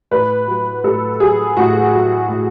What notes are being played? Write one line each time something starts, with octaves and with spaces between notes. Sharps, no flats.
A2 B4
F#3
A2 A4
F#3 G#4
A2 F#4
F#3
A2